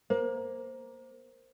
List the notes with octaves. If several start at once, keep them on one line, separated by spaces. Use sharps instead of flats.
A#3 C5